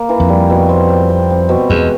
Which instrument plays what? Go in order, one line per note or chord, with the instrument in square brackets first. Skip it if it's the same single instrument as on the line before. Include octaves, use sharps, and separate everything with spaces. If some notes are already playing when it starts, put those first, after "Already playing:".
Already playing: [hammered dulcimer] A#3
E3
[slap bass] F2
[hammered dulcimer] G3
B2
C4
C4
C4
C4
B2
[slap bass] E2 [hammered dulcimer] G#3